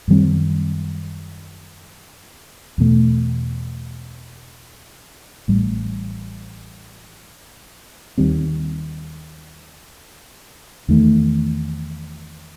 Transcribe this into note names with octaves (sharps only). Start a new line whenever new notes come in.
F#2 D#3 G3 C4
E2 B2 A3
A1 A2 G3
D#2 D#3 G3 C4
E2 D#3 A3